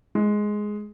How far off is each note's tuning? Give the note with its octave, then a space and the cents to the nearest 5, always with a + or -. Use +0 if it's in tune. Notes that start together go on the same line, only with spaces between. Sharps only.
G#3 +5